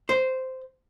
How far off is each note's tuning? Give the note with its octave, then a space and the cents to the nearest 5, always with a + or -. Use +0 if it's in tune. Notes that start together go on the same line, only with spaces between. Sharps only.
C5 -10